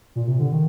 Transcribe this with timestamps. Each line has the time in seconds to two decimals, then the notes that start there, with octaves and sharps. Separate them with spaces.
0.16 A#2
0.27 C3
0.39 D3
0.52 D#3